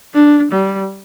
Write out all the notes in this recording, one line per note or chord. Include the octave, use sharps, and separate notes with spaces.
D4
G3